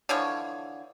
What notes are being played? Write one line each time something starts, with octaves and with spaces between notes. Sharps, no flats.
D3 E3 F3 C#5